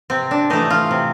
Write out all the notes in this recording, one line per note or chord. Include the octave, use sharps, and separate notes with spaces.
C3 C4
D4
E3 A3 D#4
F4
C3